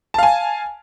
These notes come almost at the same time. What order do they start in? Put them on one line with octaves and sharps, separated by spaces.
A5 F5 G#5